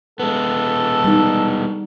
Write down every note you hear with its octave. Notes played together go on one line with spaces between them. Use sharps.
G#3 B3 A4
G3 D#4